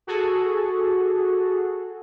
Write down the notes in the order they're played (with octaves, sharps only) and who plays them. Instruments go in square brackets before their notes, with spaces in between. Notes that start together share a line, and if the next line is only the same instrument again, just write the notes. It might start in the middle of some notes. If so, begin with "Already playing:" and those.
[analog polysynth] F#4 G#4 A4